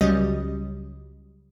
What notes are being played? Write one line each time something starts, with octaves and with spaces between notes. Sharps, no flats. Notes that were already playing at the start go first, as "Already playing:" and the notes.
C#2 F#3 G3 C#4 D#5